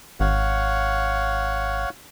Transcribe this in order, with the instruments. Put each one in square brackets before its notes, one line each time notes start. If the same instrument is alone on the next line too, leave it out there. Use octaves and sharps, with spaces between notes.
[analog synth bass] G#1 [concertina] C#5 F5 F#5